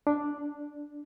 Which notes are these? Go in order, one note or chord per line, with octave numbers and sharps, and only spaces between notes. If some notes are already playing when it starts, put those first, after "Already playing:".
D4